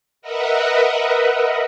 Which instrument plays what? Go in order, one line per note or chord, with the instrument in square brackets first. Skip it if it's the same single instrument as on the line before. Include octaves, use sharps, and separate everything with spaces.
[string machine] A#4 B4 D#5 E5 F#5